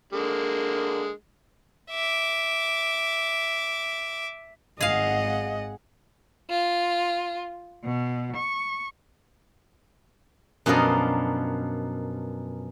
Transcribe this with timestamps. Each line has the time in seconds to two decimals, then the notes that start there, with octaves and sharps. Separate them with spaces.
0.13 D3 G#3 A#3
1.91 E5 D6
4.81 G#1 G#4 D#5 F5 F#5
6.51 F4
7.83 B2
8.36 C#6
10.66 F#2 B2 F3 D4 A#4 D#5